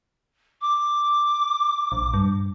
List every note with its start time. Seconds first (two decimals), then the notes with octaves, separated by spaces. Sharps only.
0.61 D6
1.92 A#1
2.14 G2